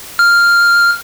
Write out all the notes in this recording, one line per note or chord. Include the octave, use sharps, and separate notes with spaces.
F6